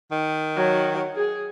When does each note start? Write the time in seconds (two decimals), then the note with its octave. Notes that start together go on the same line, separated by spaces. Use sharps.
0.11 D#3
0.56 F#3
1.15 G#4